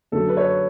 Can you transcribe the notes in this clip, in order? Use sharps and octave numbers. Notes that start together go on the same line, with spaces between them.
F#2 D3 F#3 A4
B4
C#5